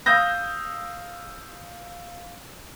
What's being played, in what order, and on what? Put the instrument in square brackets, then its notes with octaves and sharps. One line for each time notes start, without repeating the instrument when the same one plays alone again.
[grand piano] F5 D#6 E6 G6 A#6